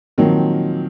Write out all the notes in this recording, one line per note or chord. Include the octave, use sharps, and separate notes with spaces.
A#2 D#3 F3 F#3 A#3 C4